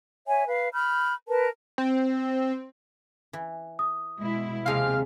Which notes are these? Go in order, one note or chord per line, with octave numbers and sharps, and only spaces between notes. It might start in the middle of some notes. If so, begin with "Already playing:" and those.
C#5 E5 G#5
B4 F5
B5 F6 G6
A#4 B4 A5
C4
E3
D#6
B2 G#3 E4
D#2 C3 F3 G#3 C4 F5